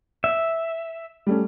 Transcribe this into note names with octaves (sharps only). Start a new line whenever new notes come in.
E5
G3 A3 C#4